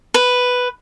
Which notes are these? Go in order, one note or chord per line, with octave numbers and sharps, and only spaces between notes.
B4